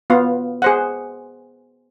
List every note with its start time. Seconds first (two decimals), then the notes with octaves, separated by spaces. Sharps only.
0.10 B3 F4 F5
0.62 G#4 C5 F#5